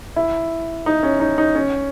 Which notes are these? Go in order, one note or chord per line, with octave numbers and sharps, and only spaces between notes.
E4
D#4
C#4
D#4
D#4
C#4